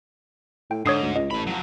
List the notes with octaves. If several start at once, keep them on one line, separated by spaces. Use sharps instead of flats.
A2 G5
G#2 D3 C#5 D#6 C7
D2
C#2 D#5
A1 A3 B5
F3 F#3